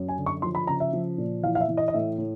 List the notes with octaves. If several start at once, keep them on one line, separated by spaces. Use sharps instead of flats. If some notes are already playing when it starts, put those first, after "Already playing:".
Already playing: F#2
G#5
D3
C#6
F3 C6
B5
C#3 A#5
E5
F3
A#2
E3 F5
F5
E5
E3
D#5
D#5
A2 E5
A2